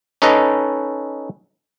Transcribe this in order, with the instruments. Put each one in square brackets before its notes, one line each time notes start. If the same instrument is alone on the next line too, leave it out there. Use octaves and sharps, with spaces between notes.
[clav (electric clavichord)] C#4 D#4 A4 B4 D#5